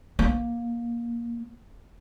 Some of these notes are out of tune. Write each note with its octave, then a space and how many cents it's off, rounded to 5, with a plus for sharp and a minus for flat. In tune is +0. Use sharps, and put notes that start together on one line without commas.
A#3 +15